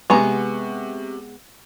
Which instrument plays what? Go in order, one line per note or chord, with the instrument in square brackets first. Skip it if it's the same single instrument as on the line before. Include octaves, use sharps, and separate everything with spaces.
[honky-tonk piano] C3 F#5 C#6 [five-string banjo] G#3 B3 A#5